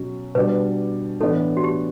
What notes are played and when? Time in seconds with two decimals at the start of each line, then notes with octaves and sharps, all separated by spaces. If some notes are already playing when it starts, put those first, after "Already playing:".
Already playing: B2 F#3 C#4
0.35 B2 G3 D4 B4
1.21 A2 E3 B3 D4 A4
1.57 F#4
1.64 G4